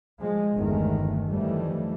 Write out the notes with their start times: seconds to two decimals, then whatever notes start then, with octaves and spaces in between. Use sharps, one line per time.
0.21 F3 G#3
0.55 G1 E2 D#3 G#3 A3
1.28 F2 D#3 E3 G3 A3